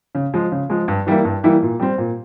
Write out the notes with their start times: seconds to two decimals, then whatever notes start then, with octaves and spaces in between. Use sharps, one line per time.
0.15 C#3
0.34 F3 G#3
0.52 C#3
0.70 F3 G#3
0.88 G2
1.07 E3 G3 A#3 E4
1.25 G2
1.43 E3 G3 A#3 E4
1.62 A#2
1.80 G3 C4
1.98 A#2